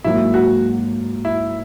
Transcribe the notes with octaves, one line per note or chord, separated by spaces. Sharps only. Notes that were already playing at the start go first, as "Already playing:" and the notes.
G#2 F#3 A#3 E4
F#4
E4